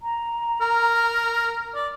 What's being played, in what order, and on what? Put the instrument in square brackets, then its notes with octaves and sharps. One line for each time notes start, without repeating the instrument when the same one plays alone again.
[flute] A#5
[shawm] A#4
D5